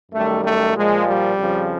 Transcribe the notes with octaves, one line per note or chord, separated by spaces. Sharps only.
F#2 D#3 G3 A3
A3
A#2 F3 G#3
G3
F2 C#3 F3